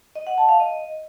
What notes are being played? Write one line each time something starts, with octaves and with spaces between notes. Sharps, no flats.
D#5
F#5
A5
F5
D#5